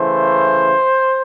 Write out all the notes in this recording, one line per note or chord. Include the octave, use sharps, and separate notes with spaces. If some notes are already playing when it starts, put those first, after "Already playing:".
Already playing: C#3 E3 A3 C5